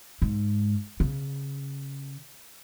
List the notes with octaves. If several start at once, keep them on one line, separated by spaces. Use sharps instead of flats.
G#2
C#3